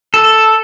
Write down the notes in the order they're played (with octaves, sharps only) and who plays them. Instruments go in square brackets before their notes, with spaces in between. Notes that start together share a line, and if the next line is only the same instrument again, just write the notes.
[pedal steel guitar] A4